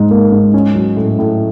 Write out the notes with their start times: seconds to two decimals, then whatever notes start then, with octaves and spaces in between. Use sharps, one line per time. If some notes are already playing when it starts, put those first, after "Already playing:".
Already playing: G#2 D#4
0.11 A#3
0.32 G#2
0.54 C#4
0.75 F#3
0.96 A2
1.19 A2